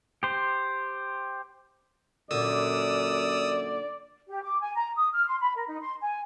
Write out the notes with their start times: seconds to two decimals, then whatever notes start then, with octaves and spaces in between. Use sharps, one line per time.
0.23 G4 C5
2.31 F#2 A#2 D3 D5 D#6 E6
4.29 G4
4.43 D6
4.60 G#5
4.76 A#5
4.97 D#6
5.13 F6
5.27 C6
5.40 B5
5.55 A#4
5.67 D#4
5.81 C6
6.01 G#5